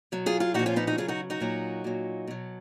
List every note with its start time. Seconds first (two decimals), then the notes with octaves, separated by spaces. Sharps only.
0.12 B2 F#3
0.26 F4 G#4
0.40 F4 G#4
0.54 A#2 F3 D#4 F#4
0.66 C#4 F4
0.76 B3 D#4
0.87 D#4 F#4
0.98 C#3 F#3 F4 G#4
1.08 D#4 F#4
1.30 D#4 F#4
1.40 A#2 F#3
1.84 A#2 F#3
2.27 B2 F#3